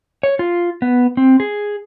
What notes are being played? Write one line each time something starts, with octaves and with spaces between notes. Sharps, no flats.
C#5
F4
B3
C4
G#4